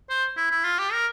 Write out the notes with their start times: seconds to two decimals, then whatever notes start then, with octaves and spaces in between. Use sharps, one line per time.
0.09 C5
0.37 E4
0.51 E4
0.64 F4
0.78 G4
0.92 A#4